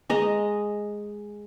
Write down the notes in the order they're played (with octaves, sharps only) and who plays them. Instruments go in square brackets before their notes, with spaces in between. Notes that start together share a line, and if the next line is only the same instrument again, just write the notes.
[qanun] G#3 D#5 A#5